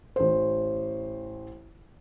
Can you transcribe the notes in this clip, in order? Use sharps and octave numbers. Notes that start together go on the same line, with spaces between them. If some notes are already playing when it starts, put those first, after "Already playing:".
A1 C5